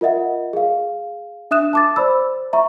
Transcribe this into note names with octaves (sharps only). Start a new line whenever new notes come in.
F4 A#4 D#5 E5 F#5
G#4 F5
D4 E5 D#6 F#6 E7
A5 D6 A6
C5 D5 B5 E6
E5 A#5 C#6